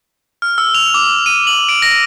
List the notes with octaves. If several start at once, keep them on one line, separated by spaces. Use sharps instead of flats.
F6
E6
F7
D6
D#7
F#7
D7
A#6